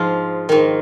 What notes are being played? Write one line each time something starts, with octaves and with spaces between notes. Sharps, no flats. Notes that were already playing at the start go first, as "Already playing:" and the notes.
Already playing: G#2 F3 F4
G#2 D#3